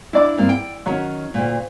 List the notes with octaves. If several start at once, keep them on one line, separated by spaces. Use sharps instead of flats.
D4 E4 D5 D6
G2 A#3 C4
G5
D#3 F#3 C#4
D2 A#2